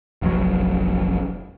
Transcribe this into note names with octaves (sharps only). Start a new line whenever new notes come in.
F1 A#1 F#3